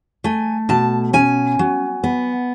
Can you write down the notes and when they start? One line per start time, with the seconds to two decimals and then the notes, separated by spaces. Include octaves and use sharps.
0.24 A3 G#5
0.69 B2 A5
1.13 C#4 G#5
1.59 F#3
2.04 B3